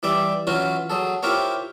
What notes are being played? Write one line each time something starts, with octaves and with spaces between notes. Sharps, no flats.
E3 G3 D5 E5
E3 F#3 C#4 F4 F#4
F#3 G#4 A4
E4 F4 G4 A#4 C5 C#5